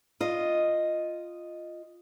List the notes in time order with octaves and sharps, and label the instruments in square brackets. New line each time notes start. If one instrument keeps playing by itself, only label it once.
[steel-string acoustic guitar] F4 D#5